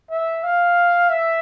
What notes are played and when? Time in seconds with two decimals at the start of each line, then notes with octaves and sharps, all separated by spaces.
0.10 E5
0.43 F5
1.09 E5